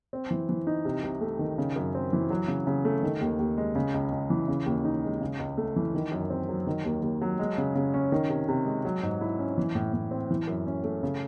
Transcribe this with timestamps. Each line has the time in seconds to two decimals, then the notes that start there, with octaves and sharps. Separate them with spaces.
0.13 C4
0.31 E3
0.49 E3
0.67 D#4
0.85 C3
1.03 C2
1.21 A3
1.39 D#3
1.58 C#3
1.76 F#2
1.95 C4
2.13 E3
2.30 F#3
2.48 C#3
2.67 C#3
2.85 A3
3.03 D#3
3.21 D#2
3.39 D#2
3.58 G#3
3.76 C#3
3.94 C#2
4.12 C#2
4.30 E3
4.48 C#3
4.66 D#2
4.85 D#4
5.04 G#3
5.21 C#3
5.39 C#2
5.58 A3
5.76 E3
5.94 D#3
6.12 F#2
6.30 C4
6.49 F#3
6.67 D#3
6.85 D#2
7.02 D#2
7.22 F#3
7.39 G#3
7.58 C#3
7.75 C#3
7.94 C#4
8.12 D#3
8.29 C3
8.49 C3
8.66 G#3
8.85 F#3
9.03 G#2
9.21 E4
9.39 C#4
9.58 E3
9.75 A2
9.93 A2
10.11 C4
10.30 E3
10.47 F#2
10.67 C#4
10.84 A3
11.03 C#3